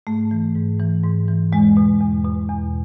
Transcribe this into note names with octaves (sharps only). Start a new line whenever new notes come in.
G#2 A3
E3
G#2
E3
G#2
E3
E2 G#3
B2
E2
B2
E2